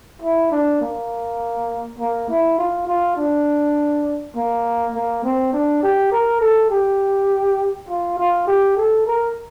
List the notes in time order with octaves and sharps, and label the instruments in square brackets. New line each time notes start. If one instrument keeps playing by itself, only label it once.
[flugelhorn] E4
D4
A#3
A#3
E4
F4
F4
D4
A#3
A#3
C4
D4
G4
A#4
A4
G4
F4
F4
G4
A4
A#4